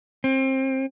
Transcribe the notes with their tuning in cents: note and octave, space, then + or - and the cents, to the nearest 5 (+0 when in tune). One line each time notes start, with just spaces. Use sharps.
C4 +25